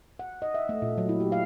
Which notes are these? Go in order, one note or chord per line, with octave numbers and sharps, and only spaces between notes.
F#5
D#5
E5
A3
A#2
F#3
E4
G4
F5